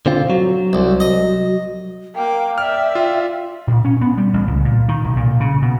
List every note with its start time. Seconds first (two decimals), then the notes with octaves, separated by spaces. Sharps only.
0.06 D3 C4 F4
0.30 F#3
0.73 C2
1.00 D#5
2.16 A#3 G5 D6
2.58 D5 E5 F6
2.95 F4
3.67 A#2
3.85 C#4
4.01 B3
4.17 G3
4.33 A1
4.47 C#2
4.65 A#2
4.88 D#3
5.04 B1
5.17 A#2
5.40 C#3
5.62 B2